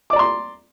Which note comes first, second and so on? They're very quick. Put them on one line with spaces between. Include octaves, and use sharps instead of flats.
D6 D5 A#5 C6